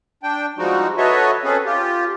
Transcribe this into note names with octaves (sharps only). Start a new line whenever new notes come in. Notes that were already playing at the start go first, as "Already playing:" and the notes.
D4 G5
F3 G3 G#3 D#4 F#4
F#4 A4 B4 C#5 D#5 E5
C4 C#4 G#4 A4 B4
F4 G4